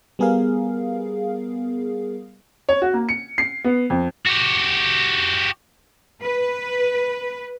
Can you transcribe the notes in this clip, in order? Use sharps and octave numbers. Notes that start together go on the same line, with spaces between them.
G3 B3 G#4 A#4 F5
C#5
F#4
A#3
C#7
C7
B3
F2
F#4 G4
B4